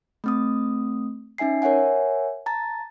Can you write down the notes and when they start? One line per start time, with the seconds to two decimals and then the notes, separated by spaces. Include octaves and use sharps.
0.24 A3 C4 D#6
1.38 C#4 D#4 E5 G#5 C7
1.62 A#4 C#5 E5 F#5 G#5
2.46 A5 A#5 A6